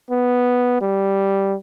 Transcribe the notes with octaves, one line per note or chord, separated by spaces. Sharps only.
B3
G3